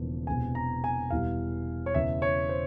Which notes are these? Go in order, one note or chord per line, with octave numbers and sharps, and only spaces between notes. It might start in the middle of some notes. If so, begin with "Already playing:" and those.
Already playing: E1 E2 C#3 F3 A#3
E1 E2 C3 G#5
A#5
G#5
E1 E2 E3 G3 F5
C#5
E1 E2 C#3 E5
C#5
C5